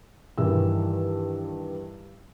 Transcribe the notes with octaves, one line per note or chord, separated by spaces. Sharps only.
G2 D#3 E3 E6